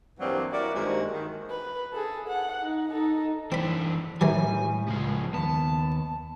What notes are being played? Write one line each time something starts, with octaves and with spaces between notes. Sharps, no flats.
G2 E3 F#3 G3 A#3 C4
E4 F#4 A#4 D5
G2 D#3 G#3 A#3 C4 F#4
D#3
B4
G#4 A4
F#5
D#4
D#4 A4
E3 C4 D4 B5
A2 D#3 E3 F#3 G3 G#5
C#2 F3 G#4
D#2 B3 A5